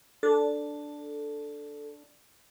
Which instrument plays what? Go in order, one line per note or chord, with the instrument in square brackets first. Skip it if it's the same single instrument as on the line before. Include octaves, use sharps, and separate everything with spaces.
[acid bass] D4 [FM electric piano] A4